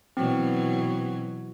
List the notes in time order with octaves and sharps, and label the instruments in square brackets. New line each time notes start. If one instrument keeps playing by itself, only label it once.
[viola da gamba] B2 E3 F#3 [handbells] C4